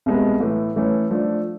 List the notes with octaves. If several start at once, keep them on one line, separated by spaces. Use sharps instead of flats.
C2 B2 G#3 B3
A2 E3 A3
E3 A3 C#4
F3 A3 D4